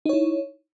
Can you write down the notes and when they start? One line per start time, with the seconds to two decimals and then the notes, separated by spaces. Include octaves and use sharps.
0.06 D#4
0.09 C#5
0.13 E4